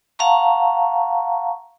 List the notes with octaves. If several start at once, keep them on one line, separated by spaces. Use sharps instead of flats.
F5 F#5 A5 A#5 C#6